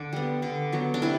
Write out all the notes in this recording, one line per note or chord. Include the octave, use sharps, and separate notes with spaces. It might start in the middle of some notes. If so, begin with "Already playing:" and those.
Already playing: D3 D4
G3 B3
D3
F#3 B3
D4
C3 E4